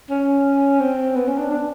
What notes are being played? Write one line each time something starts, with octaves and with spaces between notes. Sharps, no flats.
C#4
C4
B3
C#4
D4
D4